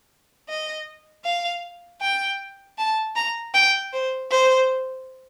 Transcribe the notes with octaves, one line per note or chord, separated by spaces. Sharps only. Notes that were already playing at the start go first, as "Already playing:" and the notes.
D#5
F5
G5
A5
A#5
G5
C5
C5